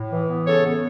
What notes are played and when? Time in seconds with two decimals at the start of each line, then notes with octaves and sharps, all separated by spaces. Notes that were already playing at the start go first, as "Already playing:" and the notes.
Already playing: A2
0.11 E3
0.30 B3
0.47 C#3 A4 C#5
0.65 B3